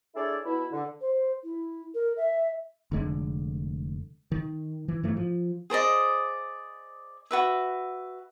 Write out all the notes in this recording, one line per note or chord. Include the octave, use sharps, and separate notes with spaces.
D4 E4 G#4 A4 C#5 D5
B2 E4
D3
C5
E4
A#4
E5
F1 D3 G#3
D#3
E3
G#2 E3 A3
F3
G#4 C5 D5 D#5
F#4 B4 E5